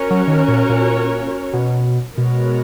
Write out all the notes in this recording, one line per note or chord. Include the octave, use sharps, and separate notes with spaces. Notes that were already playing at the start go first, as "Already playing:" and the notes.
Already playing: C#4 F#4 A#4 C#5
F#3
D#3
A#2
A#2
B2
B2 G#3 B3 F#4 A#4 C#5